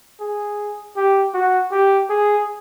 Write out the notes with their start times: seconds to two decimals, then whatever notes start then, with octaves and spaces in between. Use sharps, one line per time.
0.20 G#4
0.96 G4
1.34 F#4
1.72 G4
2.10 G#4